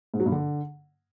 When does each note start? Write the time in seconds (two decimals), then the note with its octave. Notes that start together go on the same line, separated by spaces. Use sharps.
0.14 G#2
0.20 F#3
0.26 G2
0.32 D3